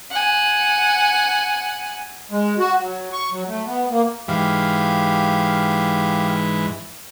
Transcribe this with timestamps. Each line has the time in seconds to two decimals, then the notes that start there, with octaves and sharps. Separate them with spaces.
0.11 F#5 G#5
2.31 G#3
2.58 F#4
2.81 F#3
3.12 C#6
3.32 F#3
3.48 A3
3.66 B3
3.90 A#3
4.28 G#2 E3 G4 F5